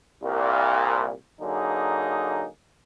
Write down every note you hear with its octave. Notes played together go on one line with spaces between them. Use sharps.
C2 A#2
D3 F#3 A#3 D#4 G#4